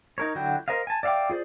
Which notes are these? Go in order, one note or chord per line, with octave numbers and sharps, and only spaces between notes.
D#4 A#4 C#5
D3 F#3 E4 F#4 G5
A#4 C5 D#5 F5
G#5 A5
D5 E5 F5 G5 D6
F4 G#4 C5 D5